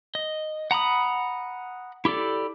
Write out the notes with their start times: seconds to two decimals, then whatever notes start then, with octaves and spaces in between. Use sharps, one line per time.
0.15 D#5
0.71 F#5 A#5 B5 D#6
2.05 E4 G4 A4 D5